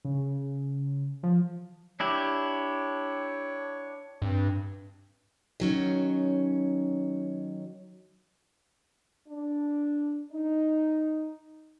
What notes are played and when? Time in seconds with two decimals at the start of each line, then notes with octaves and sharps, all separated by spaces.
0.05 C#3
1.23 F3
2.00 D4 E4 G4 C#5
4.22 G2 C4
5.60 D#3 F#3 C#4
9.28 D4
10.32 D#4